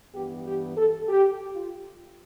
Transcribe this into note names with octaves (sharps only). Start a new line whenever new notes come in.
G2 E3 B3 G4
G4
A4
G4
F4